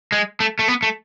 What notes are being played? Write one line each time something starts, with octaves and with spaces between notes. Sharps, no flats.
G#3
A3
A3
B3
A3